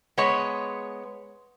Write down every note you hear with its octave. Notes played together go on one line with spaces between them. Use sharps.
G#3 B3 C#5